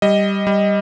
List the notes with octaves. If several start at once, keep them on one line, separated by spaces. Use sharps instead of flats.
G3 D#5
G3